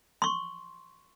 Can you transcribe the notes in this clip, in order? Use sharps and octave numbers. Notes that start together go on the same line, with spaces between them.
C6 C#6